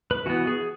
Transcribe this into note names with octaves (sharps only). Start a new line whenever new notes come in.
B4
E3 B3 F#4
G#4